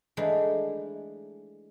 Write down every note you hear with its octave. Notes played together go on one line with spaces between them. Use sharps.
E3 G#3 A3 D4 D#4